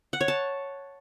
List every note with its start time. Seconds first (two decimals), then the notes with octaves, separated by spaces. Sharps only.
0.13 F#5
0.21 C#5
0.28 A5